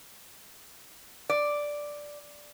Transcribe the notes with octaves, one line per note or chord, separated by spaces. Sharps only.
D5